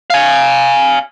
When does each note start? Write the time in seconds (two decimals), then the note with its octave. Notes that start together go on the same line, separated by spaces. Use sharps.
0.10 F5 G#5